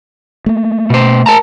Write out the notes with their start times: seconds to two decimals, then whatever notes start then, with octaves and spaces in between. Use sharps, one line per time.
0.46 A3 A#3
0.90 B2 C5
1.26 A#4 A5 A#5